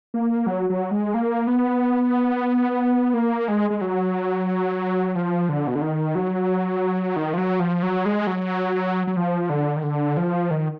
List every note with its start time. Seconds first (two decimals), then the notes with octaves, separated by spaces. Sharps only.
0.14 A#3
0.47 F#3
0.70 F#3
0.91 G#3
1.14 A#3
1.47 B3
3.14 A#3
3.48 G#3
3.70 G#3
3.81 F#3
5.15 F3
5.49 D3
5.67 B2
5.75 D3
5.82 D#3
6.15 F#3
7.16 D#3
7.33 F3
7.38 F#3
7.60 F3
7.83 F#3
8.05 G#3
8.27 F#3
9.07 F#3
9.17 F3
9.50 D3
9.76 D#3
9.83 D3
10.17 F3
10.51 D#3